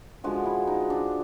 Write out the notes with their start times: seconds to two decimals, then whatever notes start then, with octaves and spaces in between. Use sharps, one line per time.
0.24 D3 F3 G#3 F#4
0.45 E4
0.67 D#4
0.90 D4